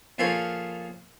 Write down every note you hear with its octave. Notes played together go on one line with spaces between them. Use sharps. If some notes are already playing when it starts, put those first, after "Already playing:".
A#2 F3 F4 G#4 A4 C#5